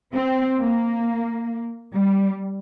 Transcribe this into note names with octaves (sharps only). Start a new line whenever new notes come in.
C4
A#3
G3